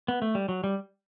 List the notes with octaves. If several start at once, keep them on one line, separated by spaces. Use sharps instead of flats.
B3
A3
G3
F#3
G3